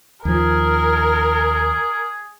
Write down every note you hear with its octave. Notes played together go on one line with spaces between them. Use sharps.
D#2 F3 G#4 A#4